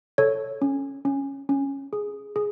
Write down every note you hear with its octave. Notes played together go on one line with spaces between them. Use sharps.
A4 C#5
C#4
C#4
C#4
G#4
G#4